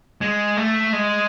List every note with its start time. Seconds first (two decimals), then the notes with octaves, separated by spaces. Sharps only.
0.21 G#3
0.57 A3
0.93 G#3